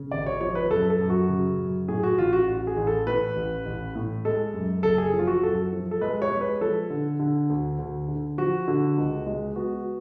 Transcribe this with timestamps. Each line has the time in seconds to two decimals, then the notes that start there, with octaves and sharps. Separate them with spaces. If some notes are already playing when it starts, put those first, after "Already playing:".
Already playing: C#3
0.11 G#1 D5
0.26 C#5
0.41 F3 C#5
0.55 B4
0.71 F#2 A4
0.90 A4
1.00 F#2
1.10 F#4
1.29 C#3
1.58 F#2
1.88 A2 G#4
2.03 F#4
2.18 A1 F4
2.33 F#4
2.47 A1
2.67 G#4
2.77 A1
2.87 A4
3.07 A2 B4
3.36 A1
3.66 A1
3.95 A2
4.25 G#3 A4
4.54 F#2
4.83 F#1 A4
4.98 G#4
5.13 F3
5.19 F4
5.27 F#4
5.43 F#2 A4
5.72 F3
5.91 A4
6.01 G#3 B4
6.22 C#5
6.32 G#3
6.41 B4
6.61 F3 A4
6.90 D3
7.19 D3
7.50 D2
7.79 D2
8.08 D3
8.38 F3 F#4
8.67 D3
8.97 C#2
9.26 G#3
9.56 B3 F#4